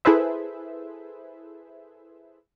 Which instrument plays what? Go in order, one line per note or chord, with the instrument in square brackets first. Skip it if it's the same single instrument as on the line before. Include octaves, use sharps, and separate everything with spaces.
[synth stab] E4 G#4 A4 B4 C5 E5